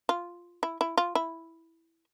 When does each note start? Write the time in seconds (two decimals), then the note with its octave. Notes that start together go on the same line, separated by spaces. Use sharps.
0.09 F4
0.63 E4
0.81 E4
0.98 F4
1.15 E4